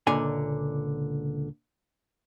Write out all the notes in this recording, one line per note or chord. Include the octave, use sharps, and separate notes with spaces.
C#2 A#2 D3 G#5